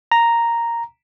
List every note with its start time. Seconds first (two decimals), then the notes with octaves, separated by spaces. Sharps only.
0.12 A#5